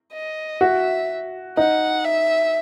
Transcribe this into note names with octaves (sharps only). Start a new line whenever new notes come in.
D#5
F#4 E5
D#4 F#5
E5